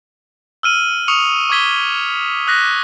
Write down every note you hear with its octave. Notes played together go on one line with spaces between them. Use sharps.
E6 F6 D#7 F#7
C#6 D#6 C#7 F7
C#6 D6 E6 G#6 B6 G7
D#6 F#6 A#6 B6